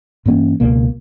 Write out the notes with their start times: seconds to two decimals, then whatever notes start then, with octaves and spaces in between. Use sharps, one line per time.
0.25 G2 E3 A#3 C#4
0.60 C#2 B2 A#3